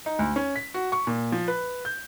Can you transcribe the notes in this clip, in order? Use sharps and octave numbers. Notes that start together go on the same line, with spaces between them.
D#4
D2
C#4
B6
F#4
C#6
A#2
F3
B4
G6